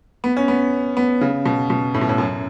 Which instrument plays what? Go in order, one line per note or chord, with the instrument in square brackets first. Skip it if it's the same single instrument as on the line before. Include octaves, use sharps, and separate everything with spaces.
[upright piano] B3
C#4
B3
B3
C#3
B2
B2
A2
B2
A2
F#2